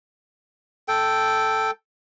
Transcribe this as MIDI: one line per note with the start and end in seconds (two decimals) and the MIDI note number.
0.88 1.71 69
0.88 1.71 79